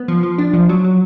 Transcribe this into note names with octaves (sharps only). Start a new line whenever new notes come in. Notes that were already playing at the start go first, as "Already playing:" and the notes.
Already playing: B3
F3
F3
D4
F3
F#3
F#3